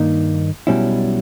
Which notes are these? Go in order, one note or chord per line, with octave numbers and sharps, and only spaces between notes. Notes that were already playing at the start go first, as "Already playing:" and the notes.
Already playing: G2 D#3 A#3 D#4
B1 B2 G3 C#4 E4